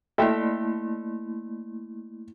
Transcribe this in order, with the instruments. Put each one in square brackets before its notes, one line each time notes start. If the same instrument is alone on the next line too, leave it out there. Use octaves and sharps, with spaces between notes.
[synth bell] A3 A#3 E4 [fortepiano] A4 E5 G5